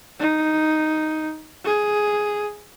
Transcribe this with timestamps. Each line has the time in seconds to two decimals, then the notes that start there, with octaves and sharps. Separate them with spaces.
0.19 D#4
1.65 G#4